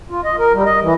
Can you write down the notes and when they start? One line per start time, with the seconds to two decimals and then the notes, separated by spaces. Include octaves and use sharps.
0.10 F4
0.24 D#5
0.39 A#4
0.53 G3
0.65 D#5
0.82 E3